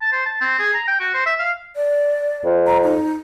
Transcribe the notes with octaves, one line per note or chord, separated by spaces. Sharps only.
A5
C5
A5
C4
G#4
A#5
G5
F#4
C5
E5
F5
D5
F2
A#5
D#4